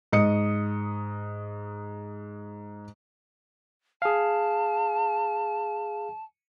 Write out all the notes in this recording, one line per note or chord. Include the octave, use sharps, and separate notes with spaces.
G#2 D#5 D#6 C#7
G#4 F5 A5